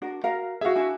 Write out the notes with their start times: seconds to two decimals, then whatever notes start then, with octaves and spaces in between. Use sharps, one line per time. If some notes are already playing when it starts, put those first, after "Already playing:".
0.02 D4 F#4 A#4
0.24 F#4 A#4 F5
0.61 F#4 G#4 E5 F5
0.76 D4 E4 G#5